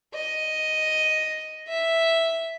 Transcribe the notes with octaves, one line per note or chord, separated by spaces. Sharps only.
D#5
E5